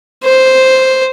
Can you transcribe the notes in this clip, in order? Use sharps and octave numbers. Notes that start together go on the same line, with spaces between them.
C5